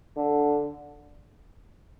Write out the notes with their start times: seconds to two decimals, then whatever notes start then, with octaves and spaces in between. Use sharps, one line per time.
0.16 D3